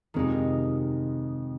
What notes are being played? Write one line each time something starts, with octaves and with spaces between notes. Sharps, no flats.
F2 C3 D#3 G#3 D#4